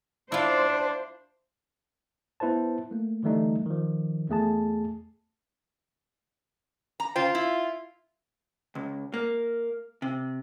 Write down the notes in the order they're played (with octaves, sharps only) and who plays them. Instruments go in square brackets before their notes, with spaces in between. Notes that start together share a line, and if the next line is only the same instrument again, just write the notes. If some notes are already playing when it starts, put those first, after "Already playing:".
[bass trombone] D4 [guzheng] E4 F4 [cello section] C5
[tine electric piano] B3 E4 B4 C5 A5
A3 A#3
D3 E3 G3 A3 D#4
D#3 F3
E2 A3 G#4 A5
[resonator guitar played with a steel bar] A#5
[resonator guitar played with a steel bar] C#3 C5 G5 [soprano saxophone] F4
[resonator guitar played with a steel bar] E4
[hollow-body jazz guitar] C#2
A#3
C3